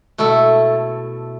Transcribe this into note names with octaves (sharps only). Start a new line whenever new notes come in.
B2 A3 E4 A4